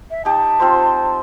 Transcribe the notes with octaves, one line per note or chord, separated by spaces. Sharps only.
E5
D#4 G4 A5
C4 F4 C5